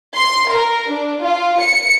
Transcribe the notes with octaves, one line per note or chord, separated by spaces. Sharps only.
C6
A#4
D4
F4
C#7